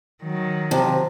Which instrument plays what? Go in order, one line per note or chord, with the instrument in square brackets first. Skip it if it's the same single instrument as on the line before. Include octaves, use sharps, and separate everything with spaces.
[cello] D#3 F#3
[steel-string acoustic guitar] C3 F3